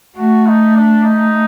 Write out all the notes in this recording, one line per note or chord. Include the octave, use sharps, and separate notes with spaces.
A3 F#4
D#4
D4
D#4